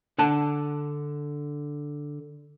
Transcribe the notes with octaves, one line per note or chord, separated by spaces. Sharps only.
D3 F#5 A5